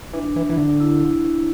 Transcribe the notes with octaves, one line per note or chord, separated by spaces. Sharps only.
E3 D4
E3
E3
D3
E4